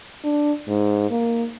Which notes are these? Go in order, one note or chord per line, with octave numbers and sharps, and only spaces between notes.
D4
G#2
A#3